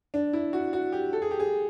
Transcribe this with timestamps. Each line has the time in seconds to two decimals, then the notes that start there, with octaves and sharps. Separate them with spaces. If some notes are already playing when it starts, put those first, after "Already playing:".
0.14 D4
0.33 E4
0.53 F#4
0.73 F#4
0.92 G4
1.13 A4
1.22 G#4
1.31 G4
1.40 G#4